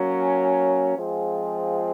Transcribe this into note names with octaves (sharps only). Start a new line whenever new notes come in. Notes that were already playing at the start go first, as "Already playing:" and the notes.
Already playing: F#3 A#3 C#4
F3 G#3 C4 F4 G#4